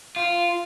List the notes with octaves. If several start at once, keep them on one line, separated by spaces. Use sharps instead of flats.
F4